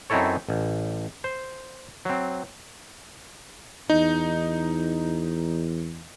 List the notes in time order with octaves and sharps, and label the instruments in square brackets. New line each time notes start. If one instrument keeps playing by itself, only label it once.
[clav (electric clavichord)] F#2 C4 D#4 E4 A4 C#5
A1
C5
F#3 C4
[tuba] E2 [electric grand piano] D#4